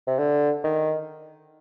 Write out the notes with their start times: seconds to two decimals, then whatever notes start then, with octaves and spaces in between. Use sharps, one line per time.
0.07 C3
0.19 D3
0.64 D#3